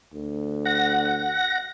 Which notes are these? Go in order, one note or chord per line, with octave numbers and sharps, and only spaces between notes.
D2
F#5 A#6